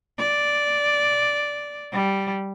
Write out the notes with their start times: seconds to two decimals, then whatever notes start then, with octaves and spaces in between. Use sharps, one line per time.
0.18 D5
1.92 G3